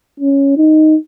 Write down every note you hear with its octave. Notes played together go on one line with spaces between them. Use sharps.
C#4
D#4